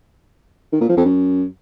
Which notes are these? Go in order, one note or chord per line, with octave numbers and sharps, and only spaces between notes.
D#3
A#2
F3
F2
F#2